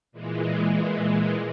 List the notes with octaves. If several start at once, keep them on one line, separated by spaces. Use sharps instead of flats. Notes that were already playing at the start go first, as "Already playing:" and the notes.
A#2 E3 G#3